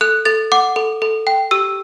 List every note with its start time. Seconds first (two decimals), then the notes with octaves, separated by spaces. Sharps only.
0.01 A4 F#6
0.25 A4 A6
0.52 F#5 D6
0.76 A4
1.02 A4
1.27 G5
1.51 G4 E6